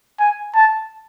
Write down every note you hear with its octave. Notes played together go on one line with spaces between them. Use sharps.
G#5
A5